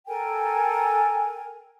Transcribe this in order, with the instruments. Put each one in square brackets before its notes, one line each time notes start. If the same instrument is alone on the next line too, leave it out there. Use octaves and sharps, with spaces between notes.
[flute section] A4 A#4 G5 G#5